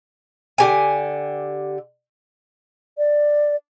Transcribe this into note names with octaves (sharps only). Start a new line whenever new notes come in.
D3 G4 G#5
D5